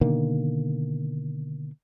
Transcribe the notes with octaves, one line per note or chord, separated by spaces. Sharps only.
B2 D3 D#3 A#3